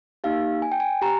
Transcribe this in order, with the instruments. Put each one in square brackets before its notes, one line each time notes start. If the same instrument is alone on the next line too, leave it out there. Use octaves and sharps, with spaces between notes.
[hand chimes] A#3 D#4 G4 F5
G#5
G5
G#5
G4 A#5